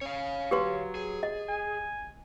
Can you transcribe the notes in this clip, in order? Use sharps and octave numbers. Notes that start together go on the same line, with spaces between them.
C#4 C#5 F5
F#3 G4 B4 C6
G#4
D#5
G#5